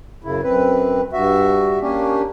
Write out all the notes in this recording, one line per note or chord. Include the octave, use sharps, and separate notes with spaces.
F#2 C#3 E4
F#2 C4 B4
G2 F#4 E5
A#3 C#4 D4 G4